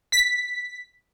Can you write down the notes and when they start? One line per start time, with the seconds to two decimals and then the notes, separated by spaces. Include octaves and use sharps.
0.12 B6